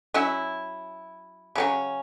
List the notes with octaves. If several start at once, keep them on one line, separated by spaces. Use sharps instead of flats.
F#3 C#4 E4
C#3 F#3 C#4